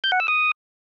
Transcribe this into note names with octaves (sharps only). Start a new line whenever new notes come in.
G6
F#5
E6
D#6